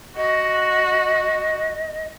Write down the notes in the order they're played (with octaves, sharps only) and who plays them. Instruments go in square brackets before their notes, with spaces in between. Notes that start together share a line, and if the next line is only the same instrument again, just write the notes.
[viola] F#4 [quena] D#5